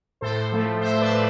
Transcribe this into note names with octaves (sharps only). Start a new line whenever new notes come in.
A2 A4 C5
F3 A3
A2 C5 E5
B4 D5
F3 A3